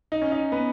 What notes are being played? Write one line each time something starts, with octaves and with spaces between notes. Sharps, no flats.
D#4
C#4
D#4
B3